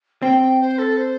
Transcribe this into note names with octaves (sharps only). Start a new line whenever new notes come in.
C4 G5
G5
C5
A4
C5